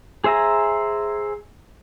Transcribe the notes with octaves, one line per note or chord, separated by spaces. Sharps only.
G#4 C5 E5 G#5 A#5